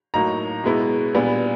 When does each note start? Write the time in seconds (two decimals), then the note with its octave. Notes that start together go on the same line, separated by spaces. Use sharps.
0.14 A2 F#3 A#3 D#4 A#5
0.64 B2 G#3 B3 E4
1.14 A#2 G3 B3 D4